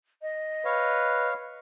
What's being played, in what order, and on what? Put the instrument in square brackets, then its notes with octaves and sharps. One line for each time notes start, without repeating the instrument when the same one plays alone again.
[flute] D#5
[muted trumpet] B4 [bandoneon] C#5 F5